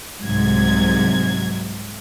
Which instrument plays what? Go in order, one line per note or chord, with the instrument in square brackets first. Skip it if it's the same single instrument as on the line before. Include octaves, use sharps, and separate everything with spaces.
[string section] C2 G#2 C3 F#3 G#6